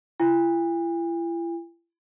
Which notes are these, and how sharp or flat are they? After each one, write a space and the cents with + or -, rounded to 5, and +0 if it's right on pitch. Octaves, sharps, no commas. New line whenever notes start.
E4 +40 G#5 -45